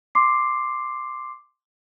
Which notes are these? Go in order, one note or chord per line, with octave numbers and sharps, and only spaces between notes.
C6 D6 C7